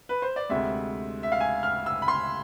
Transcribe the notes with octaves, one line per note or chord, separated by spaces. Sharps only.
B4
C5
D5
D2 C3 G#3 E5
E5
F5
G#5
F6
E6
B5
C6